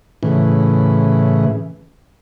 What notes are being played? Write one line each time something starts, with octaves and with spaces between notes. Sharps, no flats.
A2 C#3 E3